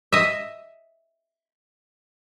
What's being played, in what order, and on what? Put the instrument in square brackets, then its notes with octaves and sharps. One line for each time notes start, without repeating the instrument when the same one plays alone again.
[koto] D#5 E5